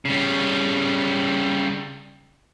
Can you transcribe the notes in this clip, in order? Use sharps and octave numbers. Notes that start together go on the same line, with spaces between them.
C#3 G3